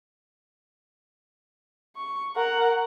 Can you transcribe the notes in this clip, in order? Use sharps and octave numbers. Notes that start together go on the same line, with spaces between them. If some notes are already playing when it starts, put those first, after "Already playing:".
C#6
A#4 F#5